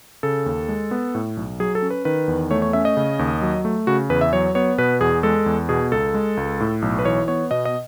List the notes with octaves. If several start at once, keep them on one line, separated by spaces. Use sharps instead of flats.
C#3 A4
D#2
G#3
B3
A2
B1
F#3 G#4
A4
C#4
B4
D#3 B4
E2
A3 C#5
C#5
C#4 E5
D#5
C#3
D#2
F#3
A3
C#3 F#4
E2 B4
E5
F#3 C#5
B3 C#5
B2 B4
E2 G#4
G#3 A4
E2
B2 G#4
C#2 A4
G#3
C#2
A2
B1
B4
E3 C#5
B3 C#5
B2 D#5
D#5